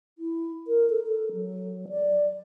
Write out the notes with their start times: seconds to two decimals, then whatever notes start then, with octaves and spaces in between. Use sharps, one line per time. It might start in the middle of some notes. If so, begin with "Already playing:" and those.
0.18 E4
0.67 A#4
0.89 A4
1.07 A4
1.33 F#3
1.89 D5